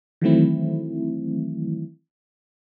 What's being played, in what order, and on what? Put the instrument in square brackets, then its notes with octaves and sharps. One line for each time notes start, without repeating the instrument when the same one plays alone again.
[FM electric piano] D#3 E3 F#3 A3 C4 E4